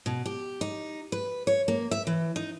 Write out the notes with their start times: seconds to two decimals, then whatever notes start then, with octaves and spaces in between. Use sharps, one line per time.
0.06 B2
0.26 G4
0.61 D#4
1.12 B4
1.47 C#5
1.68 A#3
1.91 E5
2.07 E3
2.36 D#4